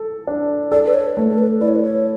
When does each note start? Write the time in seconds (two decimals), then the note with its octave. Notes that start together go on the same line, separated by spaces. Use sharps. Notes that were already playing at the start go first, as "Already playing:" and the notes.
Already playing: A4
0.27 D4
0.72 A4 D5
0.86 B4
0.94 C#5
1.16 A3 B4
1.30 A4
1.38 B4
1.61 E4 D5
1.68 C#5
1.76 B4
1.83 C#5